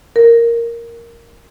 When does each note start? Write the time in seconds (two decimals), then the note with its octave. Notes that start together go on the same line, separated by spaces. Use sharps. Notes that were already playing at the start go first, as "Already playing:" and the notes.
0.16 A#4